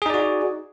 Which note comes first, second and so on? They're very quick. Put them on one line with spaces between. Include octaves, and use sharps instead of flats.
G#4 D#4 D5 F#4